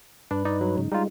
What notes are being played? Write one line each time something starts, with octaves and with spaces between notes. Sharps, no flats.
G2 D4 B4
D#4 D5
F#3
G#2 C#3
G3 G#3 D#4 F4